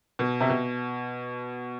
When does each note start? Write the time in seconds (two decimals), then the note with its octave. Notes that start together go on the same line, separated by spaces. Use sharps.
0.19 B2
0.41 C3
0.50 B2